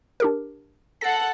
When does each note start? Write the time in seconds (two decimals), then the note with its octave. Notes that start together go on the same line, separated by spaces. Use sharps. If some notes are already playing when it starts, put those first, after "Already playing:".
0.20 D4 G4 A#4
1.01 A4 F#5 A#6 C7